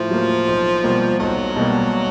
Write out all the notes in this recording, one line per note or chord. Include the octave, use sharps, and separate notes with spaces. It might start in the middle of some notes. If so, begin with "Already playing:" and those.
Already playing: A2 F3
F#3 A#3
B1
B2 G3 A#3
B1 F#3
B2 G3 A#3